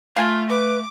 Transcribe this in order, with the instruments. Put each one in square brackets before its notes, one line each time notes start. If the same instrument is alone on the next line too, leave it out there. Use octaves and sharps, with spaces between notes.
[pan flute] A3 [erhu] F4 [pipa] F5 G#5 A5
[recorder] B4 [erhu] D6